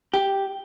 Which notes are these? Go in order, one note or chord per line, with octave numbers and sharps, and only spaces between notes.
G4